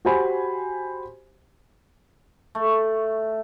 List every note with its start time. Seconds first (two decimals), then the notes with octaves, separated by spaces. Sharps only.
0.05 F#4 G4 C5 G#5 B5
2.55 A3